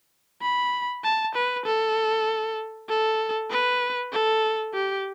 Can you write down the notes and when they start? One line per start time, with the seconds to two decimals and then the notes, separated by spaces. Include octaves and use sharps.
0.42 B5
1.03 A5
1.35 B4
1.65 A4
2.89 A4
3.50 B4
4.12 A4
4.74 G4